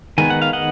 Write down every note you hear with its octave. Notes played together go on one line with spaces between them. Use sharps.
D#3 G#3 B3 G#5
F#5
F5
D#5 F#5